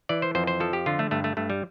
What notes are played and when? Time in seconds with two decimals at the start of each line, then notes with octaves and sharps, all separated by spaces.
0.09 E3 D5
0.22 C5
0.35 F2 C5
0.47 C5
0.60 F3 A4
0.73 G4
0.86 D3 F4
0.99 A3
1.11 G2 A3
1.24 A3
1.37 G2 A3
1.50 G3